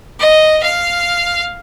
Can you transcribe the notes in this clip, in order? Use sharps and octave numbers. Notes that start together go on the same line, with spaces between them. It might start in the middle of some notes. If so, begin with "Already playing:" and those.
D#5
F5